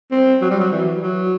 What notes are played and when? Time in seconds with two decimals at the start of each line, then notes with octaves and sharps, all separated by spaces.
0.11 C4
0.41 F#3
0.51 G3
0.60 F#3
0.72 E3
1.02 F#3